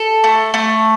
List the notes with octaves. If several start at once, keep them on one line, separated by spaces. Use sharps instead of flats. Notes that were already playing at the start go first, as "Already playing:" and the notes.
Already playing: A4
A3
A3